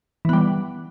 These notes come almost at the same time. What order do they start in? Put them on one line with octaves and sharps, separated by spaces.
E3 B3 G3